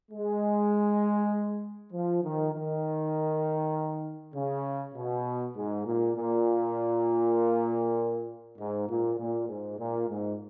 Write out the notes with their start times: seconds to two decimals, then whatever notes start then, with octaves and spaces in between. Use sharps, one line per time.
0.12 G#3
1.93 F3
2.23 D#3
2.54 D#3
4.35 C#3
4.95 B2
5.56 G#2
5.86 A#2
6.16 A#2
8.58 G#2
8.89 A#2
9.18 A#2
9.49 G#2
9.78 A#2
10.09 G#2